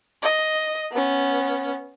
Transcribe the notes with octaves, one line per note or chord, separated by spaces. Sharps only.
D#5
B3 C#4